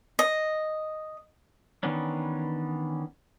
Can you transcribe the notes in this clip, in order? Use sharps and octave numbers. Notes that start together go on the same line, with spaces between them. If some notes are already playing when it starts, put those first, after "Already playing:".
D#5
D#3 E3 B3 C#4 D4